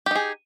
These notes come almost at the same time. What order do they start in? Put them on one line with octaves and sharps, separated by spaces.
G4 D#4 G#4